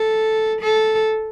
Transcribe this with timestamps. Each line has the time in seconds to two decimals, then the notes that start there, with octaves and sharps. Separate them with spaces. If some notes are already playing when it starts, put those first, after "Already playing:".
Already playing: A4
0.61 A4